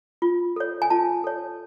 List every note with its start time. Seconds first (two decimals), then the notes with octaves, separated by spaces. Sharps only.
0.22 F4
0.56 A4 C#5
0.82 G#5
0.90 F4 A5
1.24 A4 C#5